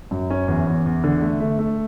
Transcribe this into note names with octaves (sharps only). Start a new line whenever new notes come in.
F#2
C#4
E2
E2
E2
D3
A3
A3
A3